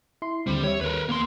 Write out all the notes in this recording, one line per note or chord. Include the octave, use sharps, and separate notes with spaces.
E4 C6
D#2 D3 G3 C4
G4 C#5 E5
D#2 A#4 B4
A#3 C6